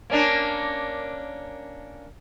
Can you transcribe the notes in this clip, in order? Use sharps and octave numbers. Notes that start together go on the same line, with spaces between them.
A#3 C#4 D4